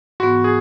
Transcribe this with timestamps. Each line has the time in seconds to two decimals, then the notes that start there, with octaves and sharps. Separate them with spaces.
0.20 G#2 E3 B3 F#4
0.44 G#4